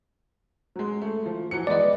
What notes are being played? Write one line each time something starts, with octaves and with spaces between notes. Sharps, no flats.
F#3 G#3
A3
F3
E3 F#3 C#7
G#3 B3 B4 D5 D#5